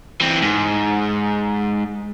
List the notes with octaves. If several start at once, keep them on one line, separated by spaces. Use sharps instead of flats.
E3 C4
G#2